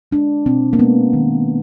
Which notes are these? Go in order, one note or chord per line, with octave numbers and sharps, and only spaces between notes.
G#3 D4
B2 C4
A#3
G#3 B3
D#3